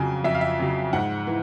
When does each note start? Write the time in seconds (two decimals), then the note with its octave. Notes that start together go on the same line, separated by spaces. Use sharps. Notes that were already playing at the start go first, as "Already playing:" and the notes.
Already playing: F2 C#3 F#3 G#5
0.24 F2 E5
0.34 F5
0.41 E5
0.59 C#3 F#3
0.93 G#2 F#5
1.27 E3